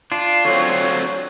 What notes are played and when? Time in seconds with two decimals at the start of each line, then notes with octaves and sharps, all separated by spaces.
0.12 D4 F4
0.45 D3 F#3 C4 C#5